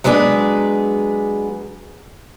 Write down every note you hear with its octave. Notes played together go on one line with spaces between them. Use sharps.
F#3 G#3 B3 D4 G#4